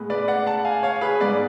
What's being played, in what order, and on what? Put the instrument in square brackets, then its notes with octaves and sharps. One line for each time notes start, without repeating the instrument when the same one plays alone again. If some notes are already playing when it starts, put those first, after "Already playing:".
Already playing: [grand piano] A2 G#3 B3
B4 D5
D5 F#5
F#5 A5
F5 G#5
C#5 F5
G#4 B4
G#2 G#3 B3 B4 D5